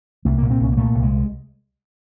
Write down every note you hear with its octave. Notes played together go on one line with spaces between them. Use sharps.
C2 A3
A#2 A#3
C4
C2 C#4
A#3
A#2 A3
C2
G#3